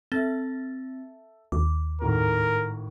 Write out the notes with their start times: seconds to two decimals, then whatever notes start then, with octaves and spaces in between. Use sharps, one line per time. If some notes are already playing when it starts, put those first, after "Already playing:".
0.12 C4 A4 E5 A6
1.52 D#2 D6
2.02 G#1 A2 A#4